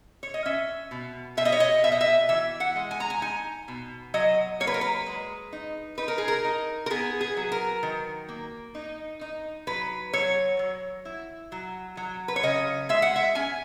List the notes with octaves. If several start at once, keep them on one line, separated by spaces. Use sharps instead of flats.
C#5
D#5
C#4 E5
B2
B2 E5
D#5
C#5
D#5
B2 E5
D#5
E5
E3 E5
F#5
G#3
G#5
A#5
G#5
D#4 G#5
B2
F#3 D#5
A#3 C#5
B4
A#4
B4
G#3
D#4
D#4 B4
A#4
G#4
A#4
D#4
A#4
B3 G#4
G#4
F#3
A#4
D#3
A#3
D#4
D#4
F#3 B4
F#3 C#5
F#3
E4
F#3
F#3
B4
C#5
C#3 D#5
G#3 E5
F#5
E5
C#4 G#5